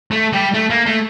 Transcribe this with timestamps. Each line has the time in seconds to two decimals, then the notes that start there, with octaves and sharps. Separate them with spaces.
0.11 A3
0.33 G3
0.54 A3
0.70 A#3
0.86 A3